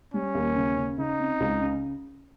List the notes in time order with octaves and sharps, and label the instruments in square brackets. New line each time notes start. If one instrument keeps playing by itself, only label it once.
[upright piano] G3 [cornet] C#4
[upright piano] D#2
C#3
C#3
[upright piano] C#3 [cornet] D#4
[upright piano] C4
C#2
C#3